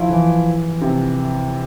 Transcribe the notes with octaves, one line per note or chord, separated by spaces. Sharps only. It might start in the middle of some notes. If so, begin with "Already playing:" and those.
Already playing: F3 E4
E3
C3